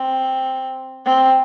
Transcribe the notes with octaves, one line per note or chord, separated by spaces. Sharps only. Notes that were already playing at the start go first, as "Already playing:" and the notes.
Already playing: C4
C4